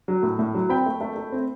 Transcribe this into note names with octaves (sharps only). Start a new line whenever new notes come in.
F#3
A2
A2
F#3
C4 G5 B5
A3
A3
A3
C4